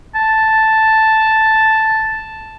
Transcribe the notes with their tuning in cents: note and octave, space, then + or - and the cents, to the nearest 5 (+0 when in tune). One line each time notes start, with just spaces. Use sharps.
A5 +0